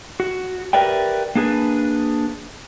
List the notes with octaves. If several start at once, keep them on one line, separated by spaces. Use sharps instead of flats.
F#4
G4 A#4 B4 D5 E5 G5
A#3 D4 G#4 B4